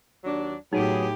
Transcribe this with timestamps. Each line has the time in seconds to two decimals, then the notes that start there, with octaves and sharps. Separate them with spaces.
0.24 D#2 F#3 D4
0.73 A2 F#3 B3 D#4 G4 G#4